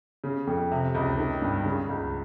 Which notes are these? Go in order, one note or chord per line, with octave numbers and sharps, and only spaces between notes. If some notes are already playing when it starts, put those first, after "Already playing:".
C#3
F2
C3
C#2
D#3
G2
C#3
C#2